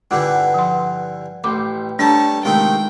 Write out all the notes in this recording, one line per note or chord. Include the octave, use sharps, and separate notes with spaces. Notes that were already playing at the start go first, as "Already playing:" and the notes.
G2 D3 E3 F4 G4 F#5 D6
F3 C6
A1 B4 G5 C6 D6
G3 A3 D4 C#5 A5 A#5
C3 D#3 G#3 A3 D#4 F4 G5